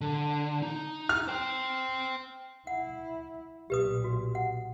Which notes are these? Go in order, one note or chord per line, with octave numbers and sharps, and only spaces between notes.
D3
D#4
F6
C5 G5
E4 F#5
B1 A#2 G4 B4 D#6
F#4
F#5